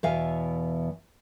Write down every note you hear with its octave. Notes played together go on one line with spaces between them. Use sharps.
E2 B2 E3 E5 F5 G#5